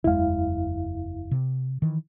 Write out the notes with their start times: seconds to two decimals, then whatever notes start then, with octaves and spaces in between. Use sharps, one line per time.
0.04 F#1 E2 G#3 E4 F5
1.31 C3
1.82 D#3 E3